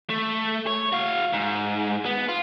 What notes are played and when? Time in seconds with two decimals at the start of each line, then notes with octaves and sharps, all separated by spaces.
0.10 A3
0.67 C#5
0.92 F#4 F5
1.33 G#2
2.06 B3
2.29 F4